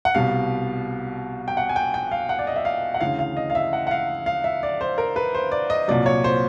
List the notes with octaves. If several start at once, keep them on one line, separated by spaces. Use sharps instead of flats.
F#5
C2 B2 G3 F5
G5
F#5
G#5
G5
G5
F5
F#5
D5
D#5
E5
F5
F#5
D2 C#3 E3 F5
F5
D#5
F5
E5
F#5
F#5
F5
F5
E5
D5
C5
A#4
B4
C5
D5
D#5
C2 A#2 F#3 D5
C#5
C5